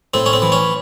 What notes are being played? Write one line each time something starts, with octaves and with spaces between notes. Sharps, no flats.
A2 C4
C#4
C4
E3
C#4